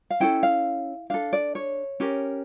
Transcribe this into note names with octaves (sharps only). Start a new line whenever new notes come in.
F5
C#4 E4 A4 G5
F5
D4 A4 F5
D5
C#5
C#4 G4 A#4